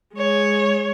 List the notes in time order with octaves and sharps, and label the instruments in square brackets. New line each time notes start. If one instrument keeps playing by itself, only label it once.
[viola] G#3 C#5